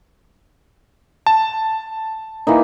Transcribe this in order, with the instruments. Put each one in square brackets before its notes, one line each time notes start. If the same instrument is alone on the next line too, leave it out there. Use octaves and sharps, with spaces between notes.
[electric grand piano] A5
[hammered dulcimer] E3 A#3 D#4